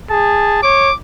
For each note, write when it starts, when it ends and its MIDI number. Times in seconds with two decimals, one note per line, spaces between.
0.10 0.61 68
0.10 0.59 81
0.63 0.90 73
0.63 0.94 86